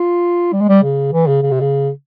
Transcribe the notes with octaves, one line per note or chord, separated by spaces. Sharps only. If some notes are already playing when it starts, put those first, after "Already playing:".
Already playing: F4
G3
G#3
G3
C#3
E3
C#3
C#3
C3
C#3